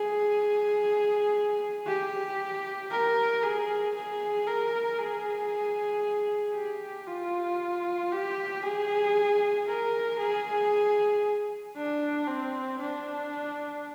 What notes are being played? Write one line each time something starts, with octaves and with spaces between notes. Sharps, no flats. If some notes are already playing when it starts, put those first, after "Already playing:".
Already playing: G#4
G4
A#4
G#4
G#4
A#4
G#4
G4
F4
G4
G#4
A#4
G#4
D4
C4
D4